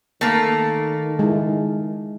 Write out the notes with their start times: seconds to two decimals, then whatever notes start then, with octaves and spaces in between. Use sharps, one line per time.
0.21 D#3 A3 A#3
1.19 G#3 E4